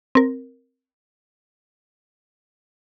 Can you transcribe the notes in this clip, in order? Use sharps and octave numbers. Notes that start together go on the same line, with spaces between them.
C4 A#4